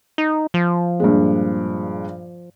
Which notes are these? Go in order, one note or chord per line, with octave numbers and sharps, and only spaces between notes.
D#4
F3
G2 A#2 G#3